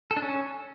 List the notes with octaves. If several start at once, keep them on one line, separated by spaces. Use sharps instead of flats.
A4
D4
C#4